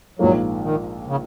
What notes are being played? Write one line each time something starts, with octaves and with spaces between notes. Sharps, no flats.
A#1 G#2 F3 F#3 A#3
D#3
C#3